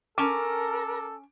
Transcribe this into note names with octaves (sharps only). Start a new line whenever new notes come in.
C#4 A4 A#4 A5 D6